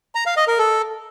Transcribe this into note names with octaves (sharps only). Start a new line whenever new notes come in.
A#5
F5
D#5
A#4
A4